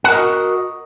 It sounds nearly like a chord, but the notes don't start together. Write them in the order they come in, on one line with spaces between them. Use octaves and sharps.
F#5 A#4 D#5 F#4